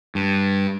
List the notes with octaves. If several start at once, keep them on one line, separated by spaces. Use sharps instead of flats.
G2